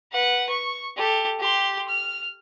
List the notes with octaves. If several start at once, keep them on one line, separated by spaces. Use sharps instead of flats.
B4 F#5
C#6
G4 A4
G4 C6
F6